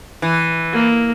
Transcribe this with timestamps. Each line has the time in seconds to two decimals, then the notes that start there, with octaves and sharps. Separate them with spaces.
0.22 E3
0.72 A#3